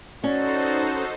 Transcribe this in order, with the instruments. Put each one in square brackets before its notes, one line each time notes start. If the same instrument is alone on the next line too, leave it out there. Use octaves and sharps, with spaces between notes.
[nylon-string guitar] C#4 [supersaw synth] D#4 A4 C5 [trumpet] F#4 [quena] D5